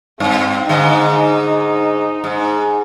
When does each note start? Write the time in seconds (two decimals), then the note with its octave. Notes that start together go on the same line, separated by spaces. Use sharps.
0.20 G2 C4
0.69 G#2 D3 D#4 D#5
2.24 G#2